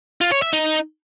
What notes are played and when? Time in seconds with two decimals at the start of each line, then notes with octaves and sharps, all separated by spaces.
0.21 F4
0.32 C#5
0.42 E5
0.53 D#4